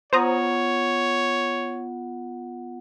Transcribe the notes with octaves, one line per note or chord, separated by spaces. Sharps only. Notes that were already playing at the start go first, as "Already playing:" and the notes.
B3 F4 C5 C#5 F#5 A#5 D#6